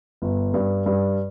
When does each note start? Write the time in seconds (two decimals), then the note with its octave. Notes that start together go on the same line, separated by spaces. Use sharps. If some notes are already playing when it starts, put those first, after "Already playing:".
0.22 G1
0.54 G2
0.86 G2